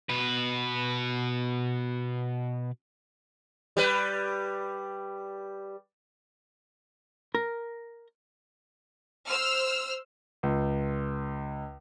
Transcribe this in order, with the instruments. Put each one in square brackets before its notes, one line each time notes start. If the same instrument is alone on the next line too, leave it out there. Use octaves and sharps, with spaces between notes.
[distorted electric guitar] B2 B4
[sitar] G3 B4
[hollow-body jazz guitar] A#4
[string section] C5 E6 F6
[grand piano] C#2